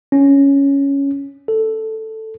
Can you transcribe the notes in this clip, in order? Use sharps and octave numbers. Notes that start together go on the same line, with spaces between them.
C#4
A4